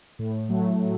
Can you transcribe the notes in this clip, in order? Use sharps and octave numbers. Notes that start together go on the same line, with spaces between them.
A2
F#3 A3
A2